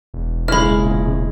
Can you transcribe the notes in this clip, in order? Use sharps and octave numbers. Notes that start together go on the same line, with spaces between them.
E1
A#1 C#3 G#3 E4 B5 F6